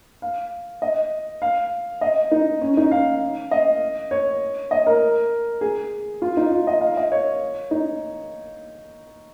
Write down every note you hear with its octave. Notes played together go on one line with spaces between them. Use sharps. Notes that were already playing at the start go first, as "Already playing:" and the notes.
F5
D#5
F5
D#5
D#4
C#4
D#4
F5
D#5
C#5
D#5
A#4
G#4
F4
D#4
F4
D#5
F5
D#5
C#5
D#4